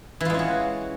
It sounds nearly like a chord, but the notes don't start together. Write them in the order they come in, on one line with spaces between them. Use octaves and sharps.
E3 F4 G#3 C#4 F#4